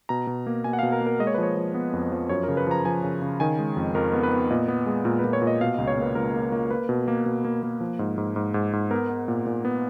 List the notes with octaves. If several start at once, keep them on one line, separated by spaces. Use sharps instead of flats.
B2 A#5
B2
A#3
B2 G#5
F#5
B2 F5
A#4
A#3
A#4
G#3 D#5
C#5
B4
F3 C#5
F3
B3
F2
F3
F#2 C#5
C#3 A#4
B4
F3 A#5
F3 G#5
C#3
C#3
D#3 G#5
G#3
F2
F2 A#4
B3
B4
B3
A#2 D#5
B3
G#3
A#2 A#4
B4
A#2
C#5
A#2
D#5
B2 F5
C#2 D#5
C#5
A#3 B4
C#2 A#4
A#3
A#3
A#3 B4
B2
A#3
B2
A#3
A#3
F3
G#2
G#2
G#2
G#2
G#2
B3 A#4
B3
A#2
A#2
B3